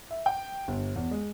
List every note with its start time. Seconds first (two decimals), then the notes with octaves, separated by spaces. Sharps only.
0.11 E5
0.26 G5
0.68 G1
0.96 E2
1.11 G#3